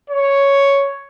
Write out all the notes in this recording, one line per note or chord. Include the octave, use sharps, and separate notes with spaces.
C#5